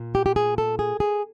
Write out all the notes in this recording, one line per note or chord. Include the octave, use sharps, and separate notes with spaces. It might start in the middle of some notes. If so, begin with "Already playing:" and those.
Already playing: A#2
G4
G4
G#4
A4
G#4
G#4